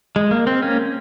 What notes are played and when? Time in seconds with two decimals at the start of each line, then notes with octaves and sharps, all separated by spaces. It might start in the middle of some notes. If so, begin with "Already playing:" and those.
0.16 G#3
0.31 A#3
0.47 C4
0.62 A#3 C#4